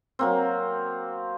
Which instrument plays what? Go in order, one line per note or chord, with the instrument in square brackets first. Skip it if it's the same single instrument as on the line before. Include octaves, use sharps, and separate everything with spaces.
[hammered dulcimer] F#3 A#3 C4